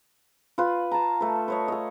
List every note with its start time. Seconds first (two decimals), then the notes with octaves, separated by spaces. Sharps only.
0.58 F4 B4
0.91 A5 A#5
1.21 A3 B4
1.48 B4 C#5 D#5
1.68 A4 D#5